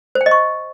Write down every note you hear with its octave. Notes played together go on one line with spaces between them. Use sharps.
C5
G5
D#5
C#6